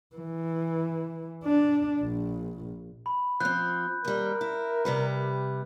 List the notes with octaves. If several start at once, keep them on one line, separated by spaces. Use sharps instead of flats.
E3
D4
A#1
B5
F3 C4 F#6 G6
D#2 G3 A#4
E4
C3 G3 B4